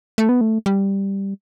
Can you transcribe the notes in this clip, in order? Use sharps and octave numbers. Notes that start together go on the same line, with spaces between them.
A3
B3
A3
G3